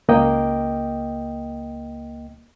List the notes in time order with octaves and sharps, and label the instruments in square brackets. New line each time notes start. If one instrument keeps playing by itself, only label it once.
[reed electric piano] C#2 A#3 D#5 G5